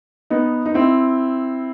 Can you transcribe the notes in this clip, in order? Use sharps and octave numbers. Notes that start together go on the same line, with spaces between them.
B3 D#4
D#4
C4 E4